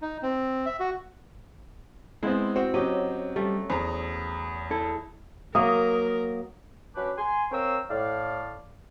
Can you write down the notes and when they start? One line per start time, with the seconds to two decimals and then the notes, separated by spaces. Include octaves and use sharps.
0.02 D#4
0.23 C4
0.66 E5
0.80 F#4
2.23 G#3 B3 C4 E4
2.56 C4 F#4
2.74 F#3 C#4 G4 D#5
3.36 G3 A3 G4
3.70 E2 C5 A#5
4.71 E4 A4
5.55 F#3 A#3 A#4 D#6
6.96 F#3 C#4 D4 G4 B4
7.17 G#5 C6
7.52 C4 A#4 C#5 F5 G5 E6
7.90 A2 D5 F5